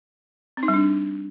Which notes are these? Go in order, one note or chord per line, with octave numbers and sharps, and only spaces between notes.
C4
D#4
G3
D4